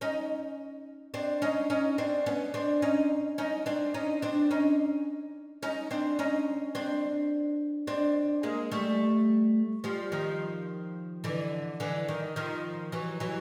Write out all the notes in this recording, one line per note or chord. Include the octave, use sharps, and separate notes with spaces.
C#4 D#4
C4 D4
C#4 D#4
C#4 D#4
C4 D4
B3 C#4
C4 D4
C#4 D#4
C#4 D#4
C4 D4
C#4 D#4
C4 D4
C#4 D#4
C#4 D#4
C4 D4
C#4 D#4
C4 D4
C4 D4
G#3 A#3
G3 A3
F3 G3
D#3 F3
D3 E3
D3 E3
D#3
D#3 F3
E3 F#3
E3 F#3